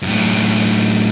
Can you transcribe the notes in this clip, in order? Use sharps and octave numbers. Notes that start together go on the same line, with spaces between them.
F#2 A2